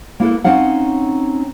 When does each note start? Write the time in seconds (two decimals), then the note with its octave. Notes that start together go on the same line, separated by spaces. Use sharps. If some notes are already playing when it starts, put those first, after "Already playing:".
0.20 A#3 E4 A4 B4
0.44 C4 C#4 D#4 F5 F#5